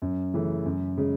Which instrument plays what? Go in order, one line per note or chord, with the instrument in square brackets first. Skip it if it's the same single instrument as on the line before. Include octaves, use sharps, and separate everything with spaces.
[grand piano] F#2
C#3 E3 A3
F#2
C#3 G#3